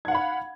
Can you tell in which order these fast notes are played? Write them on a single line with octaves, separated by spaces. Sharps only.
G#6 F#5 F5 B5